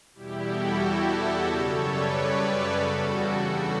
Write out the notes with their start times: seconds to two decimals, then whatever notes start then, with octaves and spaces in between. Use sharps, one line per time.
0.15 E2 B2 G3 E4 G4
0.47 F#4 A4
0.80 F#4 A4
1.44 F#2 C#3 G3 A4 C#5
1.78 B4 D5
2.10 B4 D5
2.42 A4 C#5
2.74 E2 C#3 G3 F#4 A4
3.40 B3 D4